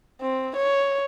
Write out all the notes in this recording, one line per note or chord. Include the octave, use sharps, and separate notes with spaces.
C4
C#5